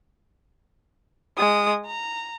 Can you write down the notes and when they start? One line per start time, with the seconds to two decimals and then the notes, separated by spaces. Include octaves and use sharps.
1.37 G#3 D#6
1.86 A#5